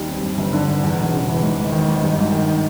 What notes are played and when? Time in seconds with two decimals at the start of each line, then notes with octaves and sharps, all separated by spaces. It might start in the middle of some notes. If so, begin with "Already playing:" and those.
Already playing: D#2 G3
0.09 C4
0.23 G2
0.38 G1
0.53 D3
0.68 G1
0.83 E2
0.98 E1
1.13 C#3
1.28 E3
1.43 G#2
1.57 G#1
1.72 D#3
1.88 G#1
2.03 G2
2.18 G#1
2.32 D#3